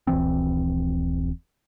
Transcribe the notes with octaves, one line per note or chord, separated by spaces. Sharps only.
D#1 A#1 E3 C4